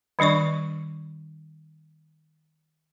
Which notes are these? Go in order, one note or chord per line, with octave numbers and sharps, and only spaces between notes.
D#3 G3 D4 D5 C#6